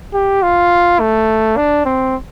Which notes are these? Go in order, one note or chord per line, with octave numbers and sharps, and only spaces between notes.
G4
F4
A3
D4
C4